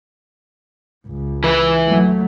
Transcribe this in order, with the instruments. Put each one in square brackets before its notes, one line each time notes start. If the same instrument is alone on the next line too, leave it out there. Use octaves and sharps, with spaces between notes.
[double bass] C#2
[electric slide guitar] E3 B4
[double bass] F#3 A3